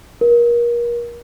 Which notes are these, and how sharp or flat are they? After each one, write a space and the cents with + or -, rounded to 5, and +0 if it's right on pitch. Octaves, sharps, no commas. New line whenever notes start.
A#4 +30